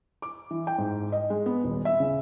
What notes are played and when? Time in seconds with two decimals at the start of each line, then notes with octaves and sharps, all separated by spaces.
0.22 D6
0.51 E3
0.67 G5
0.78 G#2
1.12 D#5
1.30 G#3
1.46 B3
1.64 D#1
1.85 E5
2.00 C#3